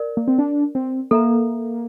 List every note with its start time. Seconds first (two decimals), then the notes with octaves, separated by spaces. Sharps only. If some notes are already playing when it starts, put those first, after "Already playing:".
Already playing: A#4 D5
0.17 A#3
0.28 C4
0.38 D4
0.75 C4
1.11 A#3 A4 E5 A#5